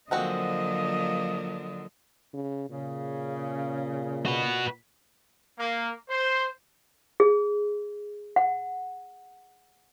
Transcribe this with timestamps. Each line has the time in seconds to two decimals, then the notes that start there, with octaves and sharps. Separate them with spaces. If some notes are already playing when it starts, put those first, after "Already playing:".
0.11 D3 F3 F#3 G#3 A#3 C4 F#4 D#5
2.33 C#3
2.69 A#2 C#3
4.26 F#4 B4
5.59 A#3
6.09 C5
7.20 G#4
8.36 F#5